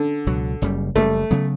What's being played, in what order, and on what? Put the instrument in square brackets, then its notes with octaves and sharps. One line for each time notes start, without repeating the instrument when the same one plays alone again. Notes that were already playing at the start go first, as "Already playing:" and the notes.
Already playing: [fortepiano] D3
[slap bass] C#2 B2 F#3
F#1 F#2 C#3 G3
[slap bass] F#1 F#2 C#3 G3 [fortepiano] A3
[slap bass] C#3 F#3 B3